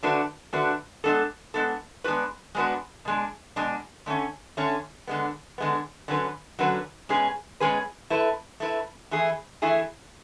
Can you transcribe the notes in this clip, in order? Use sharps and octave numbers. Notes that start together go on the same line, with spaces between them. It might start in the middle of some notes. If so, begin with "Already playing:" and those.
D3 A3 D4 F#4 B4
D3 A3 D4 F#4 B4
G#3 B3 D4 A4
G#3 B3 D4 A4
G#3 B3 D4 F#4 B4
G#3 B3 D4 F#4 B4
B2 G#3 D4
B2 G#3 D4
D3 A3 C#4
D3 A3 C#4
D3 G#3 B3
D3 G#3 B3
D3 F#3 C#4 F#4 B4
D3 F#3 C#4 F#4 B4
B2 G#3 C#4 G#4 B4
B2 G#3 C#4 G#4 B4
A3 E4 B4
A3 E4 B4
E3 A3 E4 G#4
E3 A3 E4 G#4